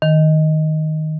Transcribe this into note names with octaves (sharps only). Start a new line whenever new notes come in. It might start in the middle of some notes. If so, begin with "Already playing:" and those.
D#3